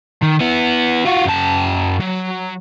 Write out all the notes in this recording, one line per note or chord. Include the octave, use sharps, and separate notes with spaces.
D#3
B3 E4
F4 F#4
F#2 A5
F#3